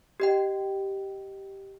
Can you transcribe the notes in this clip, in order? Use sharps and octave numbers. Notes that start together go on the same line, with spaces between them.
G4 D#5 G5